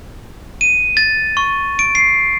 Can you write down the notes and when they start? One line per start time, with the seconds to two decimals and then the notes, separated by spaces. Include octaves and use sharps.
0.61 D#7
0.97 A6
1.37 C#6
1.79 D7
1.95 C7